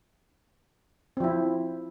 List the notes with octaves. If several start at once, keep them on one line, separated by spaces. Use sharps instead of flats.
F3 C4 E4